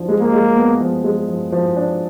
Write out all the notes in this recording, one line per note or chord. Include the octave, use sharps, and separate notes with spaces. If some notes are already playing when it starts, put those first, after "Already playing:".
Already playing: F3 D4
G#3
A#3
G#3
B3
F3
G#3
F3
F3
D4